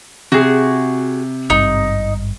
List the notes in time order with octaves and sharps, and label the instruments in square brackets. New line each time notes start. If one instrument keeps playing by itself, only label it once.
[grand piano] C3 [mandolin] F#4 G#4
[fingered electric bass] G#1 G2 [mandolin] D#4